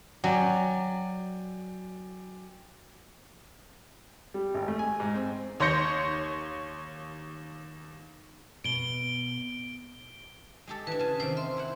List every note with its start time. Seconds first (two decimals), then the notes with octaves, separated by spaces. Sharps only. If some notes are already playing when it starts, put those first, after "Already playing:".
0.24 F#3 D5 G5 G#5
4.34 G3
4.54 G#1
4.68 A3
4.79 G#5
5.00 G#2
5.14 C4
5.60 D#2 C#5 C6 G6 A#6 C#7
8.64 B2 D7 G7
10.67 G#3 G4 A4
10.87 E3 D4 B4
10.99 C#3 G#5 A5
11.20 C3 D#3 C5 G5
11.37 E5 C6
11.57 E4 C5 F#5